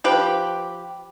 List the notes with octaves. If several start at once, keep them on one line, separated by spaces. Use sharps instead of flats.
F3 G4 B4